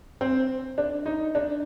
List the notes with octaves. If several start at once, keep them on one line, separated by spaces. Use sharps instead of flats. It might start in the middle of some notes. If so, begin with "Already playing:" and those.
C4
D4
D#4
D4